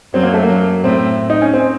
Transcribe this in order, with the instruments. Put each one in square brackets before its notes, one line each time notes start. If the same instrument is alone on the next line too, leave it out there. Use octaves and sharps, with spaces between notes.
[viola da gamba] F#2 F#3 [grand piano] C4
[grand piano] A#3
A3
A#3
[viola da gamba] F#2 F#3
[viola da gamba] A2 A3 [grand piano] C4
[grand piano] D#4
C#4
C4